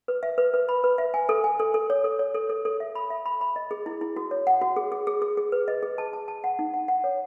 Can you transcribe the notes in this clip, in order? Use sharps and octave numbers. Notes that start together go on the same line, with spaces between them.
B4
E5
B4
B4
B5
B4
E5
G#5
A4
G#5
A4
A4
C#5
A4
C#5
A4
A4
A4
E5
B5
E5
B5
B5
D#5
G#4
E4
E4
F#4
C#5
F#5
F#4
G#4
G#4
G#4
G#4
G#4
B4
D#5
G#4
A5
A5
A5
F#5
D#4
F#5
F#5
C#5